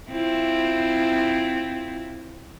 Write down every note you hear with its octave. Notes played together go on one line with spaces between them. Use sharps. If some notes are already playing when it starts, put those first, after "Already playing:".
C4 E4 F4